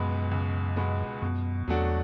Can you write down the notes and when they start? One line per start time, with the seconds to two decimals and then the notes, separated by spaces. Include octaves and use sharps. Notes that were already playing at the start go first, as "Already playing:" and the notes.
Already playing: C#2 F#2 B2 G#3 B3
0.31 C#2
0.76 B2 G#3 B3
1.22 F#2 B2
1.68 E2 F#3 A3 D4 F#4